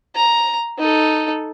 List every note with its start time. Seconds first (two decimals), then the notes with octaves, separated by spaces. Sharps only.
0.15 A#5
0.78 D#4 A4